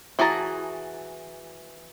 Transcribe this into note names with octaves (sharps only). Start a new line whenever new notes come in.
E3 F#4 G#4 A5 A#5